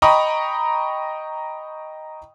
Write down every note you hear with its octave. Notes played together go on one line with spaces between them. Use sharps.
D#5 G5 A#5 B5 C#6 D#6